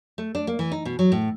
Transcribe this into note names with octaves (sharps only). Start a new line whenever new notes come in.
A3
D4
A#3
E3
D#4
B2
F#3
A2